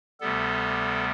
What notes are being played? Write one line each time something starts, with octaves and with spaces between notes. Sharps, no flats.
D2 C3 G3 B3 A4